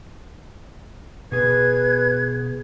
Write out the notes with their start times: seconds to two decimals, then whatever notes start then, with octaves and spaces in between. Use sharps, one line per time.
1.32 B2 G#4 B4 G#6